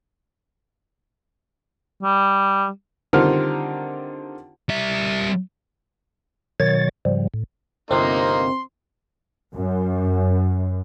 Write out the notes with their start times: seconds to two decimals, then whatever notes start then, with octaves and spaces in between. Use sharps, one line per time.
2.03 G3
3.13 D3 D#3 G3 C4 F4 A#4
4.69 G3 E5
6.60 B2 D#3 F#3 C#5 A6
7.05 G#2 C#3 F3 G3
7.34 A2
7.91 G1 C3 A#3 C4 D#4 C6
9.54 F#2